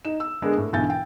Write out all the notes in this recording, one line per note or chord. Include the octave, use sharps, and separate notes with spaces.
D#4 E7
E6
D3 G#3 B3 D4 G#4 A#4
A2
B1 D3 E3 G#5 G6 A6
G5